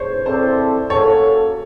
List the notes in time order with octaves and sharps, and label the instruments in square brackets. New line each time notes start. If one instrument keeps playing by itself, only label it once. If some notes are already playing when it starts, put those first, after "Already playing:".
Already playing: [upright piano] C5 C#5
[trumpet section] C4 E4 A4 D5 [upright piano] C5
[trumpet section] A#3 C#4 F#4 A4 [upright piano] C#5